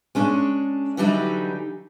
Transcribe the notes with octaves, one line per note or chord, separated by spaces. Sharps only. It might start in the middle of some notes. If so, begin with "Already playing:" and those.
G#3 C#4 D4
D3 E3 F#3 G3 C#4 D#4